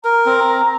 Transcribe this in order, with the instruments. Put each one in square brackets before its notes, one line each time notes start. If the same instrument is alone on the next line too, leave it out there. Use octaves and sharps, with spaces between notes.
[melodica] A#4 [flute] A#5
[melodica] C4